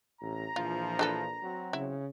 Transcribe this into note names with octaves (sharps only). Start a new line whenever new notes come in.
A1 A#5
A#1 E3 F3 F4
D4 A4 B4
F#3 C4 F#4
C#3 E4